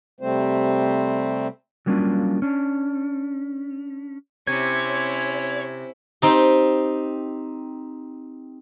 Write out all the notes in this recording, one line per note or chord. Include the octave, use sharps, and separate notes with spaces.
C3 G3 A3 C4 C5
F#3 G3 A#3 C#4 D4 F4
C#4 D4
C3 C#4 E4 C#5 G#6
C4 D#4 G4